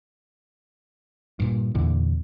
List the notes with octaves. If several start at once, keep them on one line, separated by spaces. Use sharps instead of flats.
G2 A#2
E2 A#2 D3